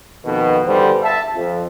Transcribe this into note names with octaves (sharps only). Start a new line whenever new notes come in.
F2 B2 D#3
G1 D3 E3 G3 G#4 C5
E5 A5
F2